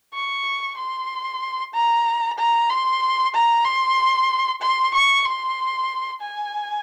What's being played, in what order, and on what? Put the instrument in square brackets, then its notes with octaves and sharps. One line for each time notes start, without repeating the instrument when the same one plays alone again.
[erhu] C#6
C6
A#5
A#5
C6
A#5
C6
C6
C#6
C6
G#5